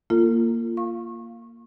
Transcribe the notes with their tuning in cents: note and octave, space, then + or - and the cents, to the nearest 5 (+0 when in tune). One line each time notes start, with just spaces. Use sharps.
A#3 +0 F4 -20 A4 +45
F5 +0 C#6 -25